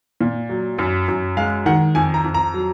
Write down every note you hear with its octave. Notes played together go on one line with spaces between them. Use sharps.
A#2
F#3
F#2
F#2
G#3 F5
D#3 F#5
F2 G#5
A#5
F2
A#5
F#3